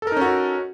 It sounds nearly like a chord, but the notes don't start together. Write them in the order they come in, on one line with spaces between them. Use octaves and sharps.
A4 A#4 D#4 C#4 F#4